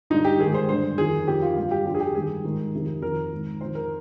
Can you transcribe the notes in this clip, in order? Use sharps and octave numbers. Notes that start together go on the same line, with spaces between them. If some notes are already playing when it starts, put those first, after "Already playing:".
G2 D3 D#4
G4
G#2 D#3 G#4
C5
G2 D3 C5
F2 D#3 G#4
F2 D#3 G4
F4
G2 D3 F4
G4
F2 D3 G4
G#4
G4
G2 D#3 G#4
G#2 D#3
F2 C3 D#3
F2 C3 D#3 A#4
G#2 D#3
F2 D#3 C5
A#4